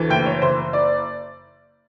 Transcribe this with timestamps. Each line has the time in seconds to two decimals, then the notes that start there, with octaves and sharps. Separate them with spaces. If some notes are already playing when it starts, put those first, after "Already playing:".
Already playing: D2 E3
0.09 F#1 G5
0.26 C#5
0.42 F#1 C5
0.73 D5